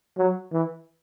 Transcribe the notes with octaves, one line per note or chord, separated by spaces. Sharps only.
F#3
E3